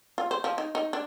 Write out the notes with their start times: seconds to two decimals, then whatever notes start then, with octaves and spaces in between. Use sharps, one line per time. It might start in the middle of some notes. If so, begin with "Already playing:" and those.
0.18 F4
0.31 C5
0.44 F3
0.58 D#4
0.75 D#4
0.93 D4